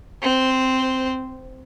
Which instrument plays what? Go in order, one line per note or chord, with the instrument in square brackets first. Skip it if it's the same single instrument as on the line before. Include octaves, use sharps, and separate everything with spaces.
[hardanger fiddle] C4 C5